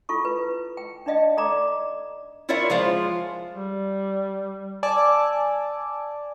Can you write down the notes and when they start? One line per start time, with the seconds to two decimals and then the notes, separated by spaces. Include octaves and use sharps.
0.09 E4 F4 A4 C#6
0.25 B4
0.77 G5
1.06 D4 D#4 D5 D#5 F5 G5
1.37 A4 D5 A#5 D6
2.49 E4 F4 A#4 C#5 D5 E5
2.70 F3 G#3 F4 C5
3.53 G3
4.83 D5 G#5 A5 D6 E6